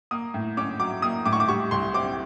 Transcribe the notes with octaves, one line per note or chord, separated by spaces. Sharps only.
A#3 D#6
A2
C#4 D6
F#3 D6
A#3 D#6
A2 D6
C#6
D6
G3 C#6
C2 C6
C4 D6